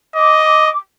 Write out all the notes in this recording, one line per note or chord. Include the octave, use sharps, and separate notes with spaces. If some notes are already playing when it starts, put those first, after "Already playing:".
D#5 D6